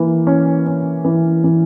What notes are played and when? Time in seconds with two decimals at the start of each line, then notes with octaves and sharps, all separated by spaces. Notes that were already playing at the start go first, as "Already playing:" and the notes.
Already playing: E3 A#3
0.27 C#4
0.67 C#4
1.05 E3
1.44 E3